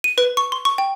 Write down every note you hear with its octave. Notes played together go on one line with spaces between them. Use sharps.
D#7
B4
C#6
C6
C#6
G5